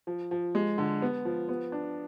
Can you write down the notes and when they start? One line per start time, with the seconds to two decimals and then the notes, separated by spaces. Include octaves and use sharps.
0.07 F3
0.31 F3
0.55 G#3
0.78 D3
1.02 B3
1.25 F3
1.49 B3
1.72 D4